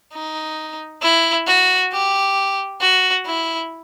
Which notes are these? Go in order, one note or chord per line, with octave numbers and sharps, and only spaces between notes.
D#4
E4
F#4
G4
F#4
E4